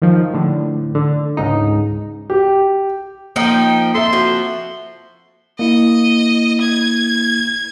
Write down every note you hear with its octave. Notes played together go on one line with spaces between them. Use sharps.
D#3 F3
A2 D3
D3
C#2 G#2 D#4
G4
F3 A#3 D#4 G5
C4 A4 E5 C6
F3 F#4
A#3 E4 D#5
G#6